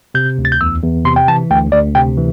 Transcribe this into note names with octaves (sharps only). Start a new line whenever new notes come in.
C3 G6
D2
A6
G6
E2 E6
E2
C3 C6
G5
E3 A5
D2 G5
D2 D5
C3 G5
E3